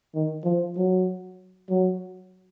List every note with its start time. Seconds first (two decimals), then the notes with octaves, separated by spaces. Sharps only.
0.15 D#3
0.45 F3
0.77 F#3
1.70 F#3